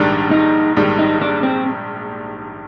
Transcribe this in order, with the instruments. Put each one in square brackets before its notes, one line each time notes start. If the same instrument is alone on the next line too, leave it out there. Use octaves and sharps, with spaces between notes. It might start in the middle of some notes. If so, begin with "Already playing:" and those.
Already playing: [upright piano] A#1 G#2 D#3 G3 [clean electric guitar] D4
[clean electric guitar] D#4
[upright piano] A#1 G#2 D#3 G3
[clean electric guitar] D#4
D4
C4